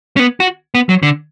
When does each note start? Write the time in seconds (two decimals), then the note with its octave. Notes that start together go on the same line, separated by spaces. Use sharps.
0.16 C#4
0.19 B3
0.40 F#4
0.75 B3
0.89 F#3
1.03 D3